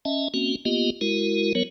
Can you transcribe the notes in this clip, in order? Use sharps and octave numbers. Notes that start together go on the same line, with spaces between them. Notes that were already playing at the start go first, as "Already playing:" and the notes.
C#4 D#5 E5 A5
A#3 C4 C#4 F#4
A#3 B3 F4 G4 D#5
G#3 E4 F#4 A#4
F#3 B3 A#4 C#5